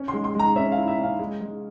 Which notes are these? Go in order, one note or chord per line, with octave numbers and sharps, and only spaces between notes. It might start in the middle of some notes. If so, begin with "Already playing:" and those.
Already playing: C#4
C6
G#3
C6
G#3 A#5
C#4 E5
F5
E4
E5
C#4
F5
G#3
G#3